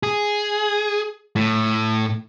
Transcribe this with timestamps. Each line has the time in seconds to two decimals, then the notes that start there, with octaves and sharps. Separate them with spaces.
0.03 G#4
1.36 A2